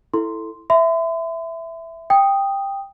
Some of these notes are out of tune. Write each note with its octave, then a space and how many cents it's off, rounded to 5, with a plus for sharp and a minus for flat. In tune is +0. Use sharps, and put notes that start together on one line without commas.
E4 +0 A4 +0 C6 -5
E5 +0 C6 -45
G5 +10 D#6 +0